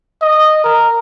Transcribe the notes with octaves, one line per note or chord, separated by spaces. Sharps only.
D#5
A#4